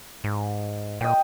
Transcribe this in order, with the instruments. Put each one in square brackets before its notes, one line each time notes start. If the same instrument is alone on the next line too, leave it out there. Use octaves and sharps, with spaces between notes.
[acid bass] G#2
[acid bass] A#2 [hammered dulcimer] D#5 G5